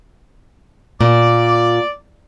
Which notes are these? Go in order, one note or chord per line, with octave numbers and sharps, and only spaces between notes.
A#2 D5